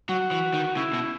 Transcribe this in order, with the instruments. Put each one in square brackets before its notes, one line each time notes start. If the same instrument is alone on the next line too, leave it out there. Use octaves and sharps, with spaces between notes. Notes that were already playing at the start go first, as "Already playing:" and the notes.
[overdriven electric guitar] F#3 [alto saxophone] F#4
[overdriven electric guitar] E3
D#3
[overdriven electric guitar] C#3 [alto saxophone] E4
[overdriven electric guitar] B2